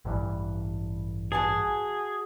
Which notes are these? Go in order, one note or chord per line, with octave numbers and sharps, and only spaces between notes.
A1 G2 E3
F#4 G#4 G#5 A5